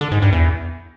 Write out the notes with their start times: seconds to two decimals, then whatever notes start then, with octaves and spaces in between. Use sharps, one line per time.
0.01 D3
0.11 G#2
0.22 G2
0.32 E2